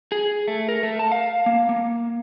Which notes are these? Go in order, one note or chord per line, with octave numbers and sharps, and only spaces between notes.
G#4
A3
A#4
A3
A5
F5
A#3
A#3